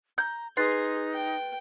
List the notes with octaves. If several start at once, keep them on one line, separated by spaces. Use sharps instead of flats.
A#5 G6
D#4 G#4 B4 C6 F#6 A6
G5